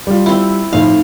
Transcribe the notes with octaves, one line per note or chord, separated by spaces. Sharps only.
G3 F4
C4 E4
F2 A2 D#4 F5